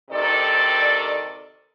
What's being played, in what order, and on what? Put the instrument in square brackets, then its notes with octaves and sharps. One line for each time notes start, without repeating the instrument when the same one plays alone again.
[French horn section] D2 C3 D#3 A4 D5